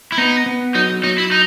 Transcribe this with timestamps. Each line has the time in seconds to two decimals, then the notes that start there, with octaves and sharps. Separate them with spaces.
0.12 E4
0.18 B3 D#4
0.46 B3
0.75 F#3 D#4
1.03 F#3 D#4
1.18 E4
1.31 D#4